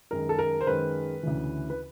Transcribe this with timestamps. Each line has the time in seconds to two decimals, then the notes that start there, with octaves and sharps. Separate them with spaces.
0.11 F#2 D#3 G#3 A#4
0.29 A4
0.39 A#4
0.61 C5
0.67 F#2 D#3 G#3 B4
1.23 D2 C#3 E3
1.70 B4